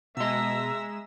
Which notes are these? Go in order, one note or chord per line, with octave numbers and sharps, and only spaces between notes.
B2 G#3 D#5 E5 A#5 E6